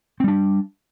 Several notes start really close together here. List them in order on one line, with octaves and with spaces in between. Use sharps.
C4 G3 D4